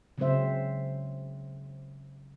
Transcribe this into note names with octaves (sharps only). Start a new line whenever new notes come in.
C#3 F#3 G#3 C4 C5 E5